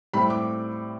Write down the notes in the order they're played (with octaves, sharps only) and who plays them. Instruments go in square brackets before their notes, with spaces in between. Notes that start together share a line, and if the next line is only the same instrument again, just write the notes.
[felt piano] A2 G3 C4 B5
D6